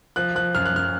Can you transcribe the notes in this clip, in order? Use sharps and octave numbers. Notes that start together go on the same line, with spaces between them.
F3 F#6
F3 F#6
F#2 F6
F#6
F#2 F6